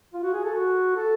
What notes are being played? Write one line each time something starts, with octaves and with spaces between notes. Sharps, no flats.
F4
F#4
G#4
A4
F#4
A4